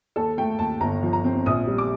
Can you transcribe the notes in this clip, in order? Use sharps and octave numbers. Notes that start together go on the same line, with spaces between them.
D#2 A4
A3 G5
D#2 A5
G1 A#5
F3
A#5
C4
A#1 D#6
G3
D6